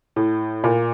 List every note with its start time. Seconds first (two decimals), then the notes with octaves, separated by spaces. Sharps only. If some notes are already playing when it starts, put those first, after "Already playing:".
0.16 A2
0.64 A#2